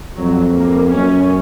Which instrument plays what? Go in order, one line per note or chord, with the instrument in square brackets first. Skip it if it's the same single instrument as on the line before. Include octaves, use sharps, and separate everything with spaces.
[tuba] F2 [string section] F#3
[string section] A#3
[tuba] F#2 [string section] C#4